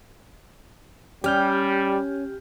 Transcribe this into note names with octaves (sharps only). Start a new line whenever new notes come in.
G3 C#4 G4 F6 G6